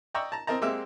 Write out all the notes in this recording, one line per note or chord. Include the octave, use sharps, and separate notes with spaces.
D5 D#5 G5 A#5 C#6 E6
A5 A#5
C4 A#4 D#5 A5 A#5
G#3 A#3 C4 G4 E5